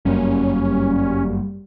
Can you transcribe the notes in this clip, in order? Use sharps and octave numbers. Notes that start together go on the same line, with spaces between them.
G1 F#2 G3 A#3 C#4